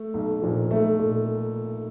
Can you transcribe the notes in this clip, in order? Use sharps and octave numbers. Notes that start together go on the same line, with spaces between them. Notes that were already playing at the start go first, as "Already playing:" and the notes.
Already playing: A3
B1
A#2 F3
B1 A3
A#2